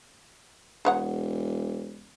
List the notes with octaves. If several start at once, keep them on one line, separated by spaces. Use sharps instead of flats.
E1 G#4 C#5 F#5